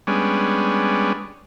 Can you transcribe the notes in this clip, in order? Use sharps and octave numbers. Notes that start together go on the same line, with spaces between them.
G3 G#3 B3 C#4 D4